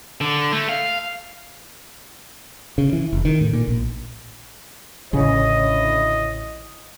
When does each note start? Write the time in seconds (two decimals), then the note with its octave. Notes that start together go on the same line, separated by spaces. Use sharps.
0.21 D3
0.52 A3
0.69 F5
2.78 C#3
2.93 E3
3.13 F1
3.25 D#3
3.41 A2
3.53 A#2
3.67 A#1
5.13 A1 D2 C#3 E4 C#5 D#5